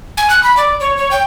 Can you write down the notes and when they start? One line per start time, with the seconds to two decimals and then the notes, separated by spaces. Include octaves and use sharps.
0.17 G#5
0.30 F#6
0.43 B5
0.57 D5
0.80 C#5
0.97 C#5
1.11 G5